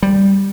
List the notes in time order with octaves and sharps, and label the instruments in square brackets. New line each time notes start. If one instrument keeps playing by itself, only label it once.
[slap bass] G3